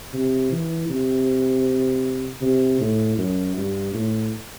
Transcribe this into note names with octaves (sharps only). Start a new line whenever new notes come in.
C3
E3
C3
C3
A2
F#2
G2
A2